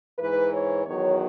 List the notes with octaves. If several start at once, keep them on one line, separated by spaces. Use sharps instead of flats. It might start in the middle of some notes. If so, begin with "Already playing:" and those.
G#2 E3 B4
C#5
E2 D#3 F#3 C#5